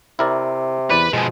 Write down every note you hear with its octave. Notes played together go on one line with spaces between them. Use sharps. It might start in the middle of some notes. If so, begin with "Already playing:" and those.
C3 E4 A#4 D5
E2 B4 D5
B2 F3 G#3 G#4